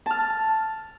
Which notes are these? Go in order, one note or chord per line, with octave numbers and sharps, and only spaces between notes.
A5 F6